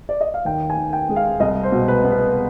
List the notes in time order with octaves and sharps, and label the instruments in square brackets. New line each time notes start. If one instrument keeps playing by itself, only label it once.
[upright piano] D5
D#5
F5
D#2 G5
G#5
D#3
G5
G#3
F5
C2 D#5
C5
B2
B4
B3
B4